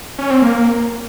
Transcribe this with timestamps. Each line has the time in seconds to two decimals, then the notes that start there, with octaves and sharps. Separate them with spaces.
0.19 C#4
0.30 C4
0.42 A#3